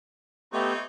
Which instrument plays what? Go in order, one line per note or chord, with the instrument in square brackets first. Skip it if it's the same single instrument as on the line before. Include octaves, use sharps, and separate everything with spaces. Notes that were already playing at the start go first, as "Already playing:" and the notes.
[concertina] A3 B3 G4 [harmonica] C4 D#4 C#5